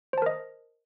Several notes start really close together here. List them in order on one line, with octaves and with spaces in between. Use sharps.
C5 A5 A#4 D#5